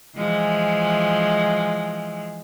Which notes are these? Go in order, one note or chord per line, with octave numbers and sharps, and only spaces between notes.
E3 F3 G#3